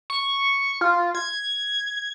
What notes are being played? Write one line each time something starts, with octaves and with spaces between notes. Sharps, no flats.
C#6
F4
G#6